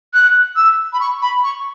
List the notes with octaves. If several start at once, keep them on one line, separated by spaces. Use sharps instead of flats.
F#6
E6
B5
C#6
B5
C#6